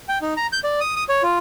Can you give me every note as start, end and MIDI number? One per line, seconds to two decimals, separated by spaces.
0.09 0.18 79
0.22 0.34 63
0.37 0.47 82
0.53 0.60 91
0.64 0.80 74
0.80 0.95 87
0.96 1.04 87
1.09 1.22 73
1.23 1.39 65